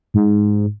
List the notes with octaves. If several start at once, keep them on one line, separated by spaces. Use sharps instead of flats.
G#2